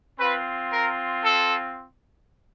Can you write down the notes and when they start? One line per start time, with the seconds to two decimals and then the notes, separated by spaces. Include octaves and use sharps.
0.19 C4 F4 B4
0.72 A#4
1.24 A4